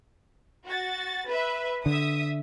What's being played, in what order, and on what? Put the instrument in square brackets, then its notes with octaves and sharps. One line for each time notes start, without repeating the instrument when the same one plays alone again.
[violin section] F#4 A6
B4 E5
[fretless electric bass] D3 [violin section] E5 D#6